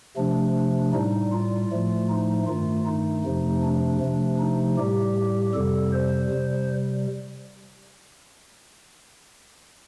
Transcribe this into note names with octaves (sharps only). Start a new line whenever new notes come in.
C3 F3 A3 D4
A2 G3 D#4
F4
A2 F3 A3
D#4
G2 D#3 A3 F4
D#4
F2 C3 F3 A3
D4
C3 F3 A3
D#4
A2 G3 G4
F2 C3 G3 A4
C5
C3 G3